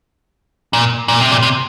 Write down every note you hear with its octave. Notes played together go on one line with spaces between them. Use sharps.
A#2
A#2
C3
A#2
C3